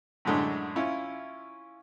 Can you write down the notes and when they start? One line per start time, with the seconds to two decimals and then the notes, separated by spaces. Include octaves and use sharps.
0.25 F#2 A2 D3 G#3 A3 D4
0.76 C#4 E4 F4